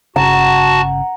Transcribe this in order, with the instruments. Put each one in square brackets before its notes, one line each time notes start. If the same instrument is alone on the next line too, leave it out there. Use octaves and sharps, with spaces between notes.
[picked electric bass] G1 C#3 [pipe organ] F#4 A5 [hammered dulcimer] F#5 A#5